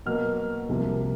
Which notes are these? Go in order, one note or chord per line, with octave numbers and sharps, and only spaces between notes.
B2 F#3 A#3 F6
C2 C3 F3 A#3